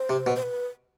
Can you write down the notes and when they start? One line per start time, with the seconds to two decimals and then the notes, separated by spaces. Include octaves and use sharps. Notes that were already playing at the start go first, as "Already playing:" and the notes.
Already playing: C5
0.10 C3
0.27 B2
0.36 C5
0.43 B4